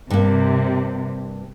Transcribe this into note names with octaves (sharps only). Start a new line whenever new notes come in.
G2 C3 A#3